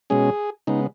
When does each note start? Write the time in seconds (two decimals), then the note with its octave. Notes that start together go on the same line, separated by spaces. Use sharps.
0.10 B2 G#3 C#4 G#4
0.67 C#3 G#3 B3 D#4